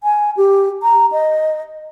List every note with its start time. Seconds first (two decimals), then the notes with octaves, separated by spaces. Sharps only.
0.03 G#5
0.37 G4
0.83 A#5
1.12 D#5